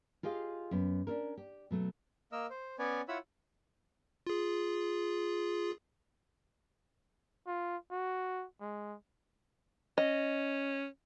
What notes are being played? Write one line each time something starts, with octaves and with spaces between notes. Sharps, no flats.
F4 G4 G#4 D#5 F5
F#2 B3
C#4 D4 E4 A#4
G4
B2 F#3 A3
A#3 A#4 D#5 E6
C5
B3 C#4 B4 C#5 D5 G#5
E4 F4 C#5 F#5 B5 E6
F4 G#4
F4
F#4
G#3
C#4 D#5